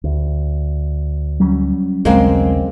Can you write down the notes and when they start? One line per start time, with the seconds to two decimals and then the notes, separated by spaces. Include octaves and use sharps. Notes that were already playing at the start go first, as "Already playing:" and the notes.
0.04 D2
1.40 F#3 G3 C#4
2.05 A#1 D#2 C#3 G#3 A#3 C4